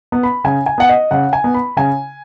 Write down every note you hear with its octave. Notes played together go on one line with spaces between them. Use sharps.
B3
B5
C#3 G#5
G#5
B3 F#5
D#5
C#3 F#5
G#5
B3
B5
C#3 G#5